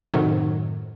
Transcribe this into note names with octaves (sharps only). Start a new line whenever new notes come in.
F#2 A2 C3 D#3 F#3